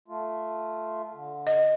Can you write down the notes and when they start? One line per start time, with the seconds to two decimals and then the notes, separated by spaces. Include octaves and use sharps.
0.08 A3 F4
1.13 D3
1.47 D#5